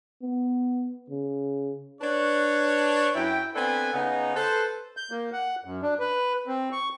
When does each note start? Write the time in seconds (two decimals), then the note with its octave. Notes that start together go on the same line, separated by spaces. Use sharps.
0.22 B3
1.10 C#3
2.02 D4 B4 C#5
3.15 F#2 E4 G5
3.55 B3 C4 D4 A4 B4 G#5
3.93 C#3 B3 D#4
4.35 A4 B4 C5
4.97 G6
5.11 A#3
5.33 F#5
5.64 F#2
5.82 D4
5.99 B4
6.47 C4
6.72 C#6